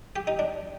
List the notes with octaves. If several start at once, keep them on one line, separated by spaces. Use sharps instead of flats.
G4
D#4
D4